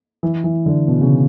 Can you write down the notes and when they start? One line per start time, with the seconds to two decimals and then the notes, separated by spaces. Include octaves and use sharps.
0.23 E3
0.44 E3
0.66 D3
0.88 B2
1.01 C#3